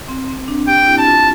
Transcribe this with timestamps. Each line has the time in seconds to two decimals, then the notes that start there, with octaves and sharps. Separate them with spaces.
0.08 C4
0.28 C4
0.48 D4
0.67 G4 G5
0.87 E4
0.98 A5
1.07 F4